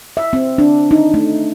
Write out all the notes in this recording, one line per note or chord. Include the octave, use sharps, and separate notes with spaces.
E5
C4
D4
D#4
A3